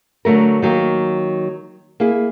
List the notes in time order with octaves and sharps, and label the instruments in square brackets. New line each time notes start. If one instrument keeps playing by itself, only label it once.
[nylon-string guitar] D3 F#3 A3 A#4
D#3 F#3 A#3
A#3 E4 G#4